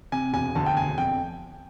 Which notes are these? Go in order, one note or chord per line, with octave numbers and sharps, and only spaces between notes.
C3 G#5
E1 G#5
D2 A5
G5
E1 G#5
F2 G5